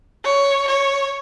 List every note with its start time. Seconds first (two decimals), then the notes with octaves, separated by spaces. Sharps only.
0.25 C#5
0.68 C#5